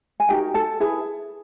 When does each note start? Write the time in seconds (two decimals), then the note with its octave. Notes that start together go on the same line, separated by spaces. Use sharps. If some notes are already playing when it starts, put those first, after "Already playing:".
0.20 G#5
0.29 D#4 F#4 G4 A#4 G5
0.54 A4 A5
0.80 E4 G#4 B4